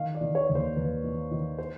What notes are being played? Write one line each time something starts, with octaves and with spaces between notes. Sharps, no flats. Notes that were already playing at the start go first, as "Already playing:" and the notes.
Already playing: D#3 F5
D5
D#3
C#5
D#2
C5
D#2 B4
D#3
D#3
C5